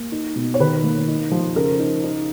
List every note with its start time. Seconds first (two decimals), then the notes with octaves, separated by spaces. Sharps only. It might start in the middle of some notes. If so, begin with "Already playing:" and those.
Already playing: A#3
0.12 D#4
0.36 B2
0.54 C#5
0.60 D#3 B4
0.84 A#3
1.08 D#4
1.31 F3
1.56 C#3 A#4
1.79 D#4
2.04 D#4